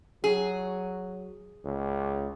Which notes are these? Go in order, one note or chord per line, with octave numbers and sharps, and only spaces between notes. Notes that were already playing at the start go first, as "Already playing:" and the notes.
F#3 G#4
C#2